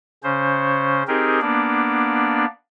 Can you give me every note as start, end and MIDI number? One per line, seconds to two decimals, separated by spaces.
0.23 1.03 49
0.23 1.03 61
0.23 1.03 72
1.08 1.40 60
1.08 1.40 63
1.08 1.40 67
1.08 1.40 68
1.08 1.40 70
1.41 2.45 58
1.41 2.45 59
1.41 2.45 62
1.41 2.45 74